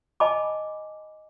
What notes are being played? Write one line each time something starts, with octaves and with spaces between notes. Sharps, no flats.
D#5 G#5 A5 B5 D6